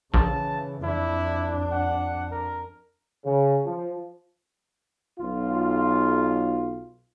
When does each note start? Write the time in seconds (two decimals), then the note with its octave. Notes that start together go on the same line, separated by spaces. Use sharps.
0.14 A#1 C#3 E3 A5
0.83 F2 D4 E4
1.72 F#5
2.31 A#4
3.25 C#3
3.65 F3
5.20 B1 F4